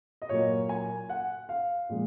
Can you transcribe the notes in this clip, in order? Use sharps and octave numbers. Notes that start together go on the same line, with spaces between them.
D#5
A#2 F#3 A#3 C#5
G#5
F#5
F5
A#2 F3 G#3